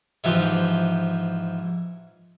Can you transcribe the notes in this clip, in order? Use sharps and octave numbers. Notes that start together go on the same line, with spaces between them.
G#2 E3 F3 G4